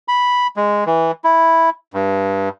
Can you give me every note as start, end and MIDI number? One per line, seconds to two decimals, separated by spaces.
0.08 0.47 83
0.56 0.84 56
0.86 1.11 52
1.24 1.70 64
1.94 2.49 43